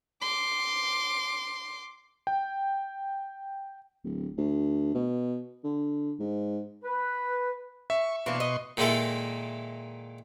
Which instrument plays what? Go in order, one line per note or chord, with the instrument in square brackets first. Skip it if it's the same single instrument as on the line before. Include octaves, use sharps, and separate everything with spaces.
[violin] C6 D6
[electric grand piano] G5
[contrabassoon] D1
D2
B2
D3
G#2
[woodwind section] B4
[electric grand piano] E5 [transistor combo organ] C#6
[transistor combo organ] B2 C6 C#6 [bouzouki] E3 A#3 D4
[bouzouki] D#5
[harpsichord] A#2 D#3 G#3 A#3 E4 A4